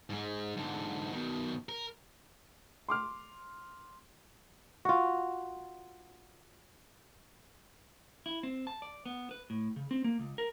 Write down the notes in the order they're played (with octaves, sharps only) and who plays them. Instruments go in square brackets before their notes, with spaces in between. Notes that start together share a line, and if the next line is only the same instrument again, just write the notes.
[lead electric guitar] G#2 G#3
G#2 D3
B2 D#3
A#4
[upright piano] C6 D6 F6
[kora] F4 F#4
[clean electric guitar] E4
C4
A5
D5
B3
B4
A2
C#3
C4
A#3
C#2
A#4